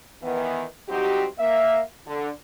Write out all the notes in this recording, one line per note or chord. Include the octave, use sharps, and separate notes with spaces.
D#3 E3 B3
F#3 G3 C4 D#4 F#4 G4
A#3 E5
D3